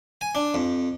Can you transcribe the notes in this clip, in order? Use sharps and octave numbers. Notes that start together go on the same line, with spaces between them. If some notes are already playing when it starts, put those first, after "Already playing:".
G#5
D4
F2